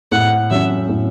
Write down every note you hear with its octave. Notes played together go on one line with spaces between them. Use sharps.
A2 F#5
F#3 C#4 E5
A2